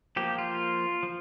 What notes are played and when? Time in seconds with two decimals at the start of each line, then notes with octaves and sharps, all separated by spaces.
0.16 F3 A#3 G4
0.38 F4
1.03 F3